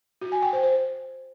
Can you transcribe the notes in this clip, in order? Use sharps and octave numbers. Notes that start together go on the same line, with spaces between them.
F#4
G#5
G5
C5
C5